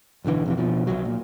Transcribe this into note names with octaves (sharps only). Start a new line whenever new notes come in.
D1 B1 D3 E3
F2 C3 E3
B2 F3
C2 F#3
A#2